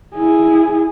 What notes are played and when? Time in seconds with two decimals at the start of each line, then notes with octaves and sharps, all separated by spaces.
0.15 E4 G#4